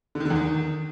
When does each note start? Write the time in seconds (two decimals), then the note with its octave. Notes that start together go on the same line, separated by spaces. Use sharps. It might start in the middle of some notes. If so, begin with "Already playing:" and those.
0.15 D3
0.20 D#3
0.25 D3
0.30 E2
0.35 D#3